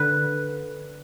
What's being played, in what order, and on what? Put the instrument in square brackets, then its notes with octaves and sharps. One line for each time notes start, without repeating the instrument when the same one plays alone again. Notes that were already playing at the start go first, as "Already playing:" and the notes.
Already playing: [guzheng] D3 B4